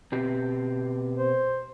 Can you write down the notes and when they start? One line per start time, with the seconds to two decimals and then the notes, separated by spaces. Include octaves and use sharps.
0.12 B2 C4 G4
1.17 C5